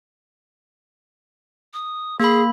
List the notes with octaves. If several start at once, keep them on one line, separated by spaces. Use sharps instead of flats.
D#6
A#3 G#4 B5